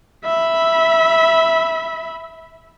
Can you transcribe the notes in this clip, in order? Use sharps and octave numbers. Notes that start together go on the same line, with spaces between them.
E5 B5